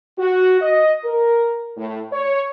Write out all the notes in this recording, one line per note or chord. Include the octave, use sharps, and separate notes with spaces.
F#4
D#5
A#4
A2
C#5